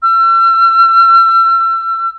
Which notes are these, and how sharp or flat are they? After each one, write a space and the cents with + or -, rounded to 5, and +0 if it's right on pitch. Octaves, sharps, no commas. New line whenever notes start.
E6 +40